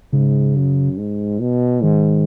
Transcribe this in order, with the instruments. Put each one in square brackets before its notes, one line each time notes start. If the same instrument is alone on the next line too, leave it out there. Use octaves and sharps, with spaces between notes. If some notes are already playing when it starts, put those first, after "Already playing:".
[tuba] G#2 [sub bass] C#3
[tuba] F#2
G#2
B2
[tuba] G#2 [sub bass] D#3